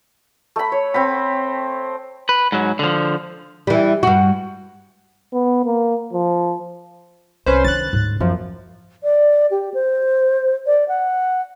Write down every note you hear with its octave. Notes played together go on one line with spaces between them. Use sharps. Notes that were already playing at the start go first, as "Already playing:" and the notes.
A3 B5
C#5
C4 G5 B5
B4
G#2 F#3
D3 F3
E3 G3
G2 F#4
B3
A#3
F3
C2 C#4 B4 C5
D#3 D4 F#6 A6
D2 G#2
F#2 E3 F3 B3
D5
G4
C5
D5
F#5